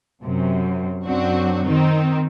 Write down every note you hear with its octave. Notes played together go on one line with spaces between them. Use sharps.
F#2 C3
F#2 F#3 C4 D4 F#4
D#3 C4 D#4